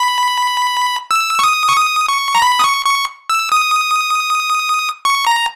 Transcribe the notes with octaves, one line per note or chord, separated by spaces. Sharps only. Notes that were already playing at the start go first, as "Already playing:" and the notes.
Already playing: B5
E6
C#6
D#6
C#6
D#6
C#6
A#5
B5
D#6
C#6
C#6
E6
D#6
C#6
A#5